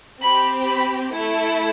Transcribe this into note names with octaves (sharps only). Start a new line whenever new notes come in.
C4 G4 B5
B5
A3 E4 A4